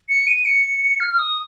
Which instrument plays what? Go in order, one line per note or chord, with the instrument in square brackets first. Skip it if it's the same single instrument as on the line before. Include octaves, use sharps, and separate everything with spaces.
[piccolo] C#7
D#7
C#7
F6
F6
D#6